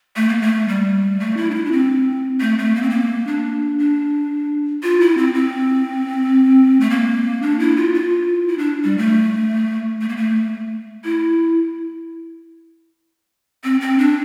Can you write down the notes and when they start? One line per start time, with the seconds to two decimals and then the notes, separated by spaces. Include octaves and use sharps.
0.16 A3
0.29 A#3
0.41 A3
0.68 G3
1.20 A3
1.37 E4
1.51 D4
1.54 E4
1.65 D4
1.72 C4
2.41 A3
2.58 A3
2.76 A#3
2.82 C4
2.90 A#3
3.27 D4
3.79 D4
4.83 F4
5.00 E4
5.18 C4
5.34 C4
6.80 A3
6.90 A#3
7.42 D4
7.60 E4
7.77 F4
7.94 F4
8.48 E4
8.58 D4
8.84 G3
8.98 A3
10.01 A3
10.09 A#3
10.17 A3
11.04 E4
13.64 C4
13.81 C4
13.98 D4